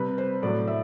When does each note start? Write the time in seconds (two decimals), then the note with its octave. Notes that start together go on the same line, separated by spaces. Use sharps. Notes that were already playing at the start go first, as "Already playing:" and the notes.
Already playing: C3 G3 B4
0.18 C5
0.42 A2 F#3 D5
0.67 E5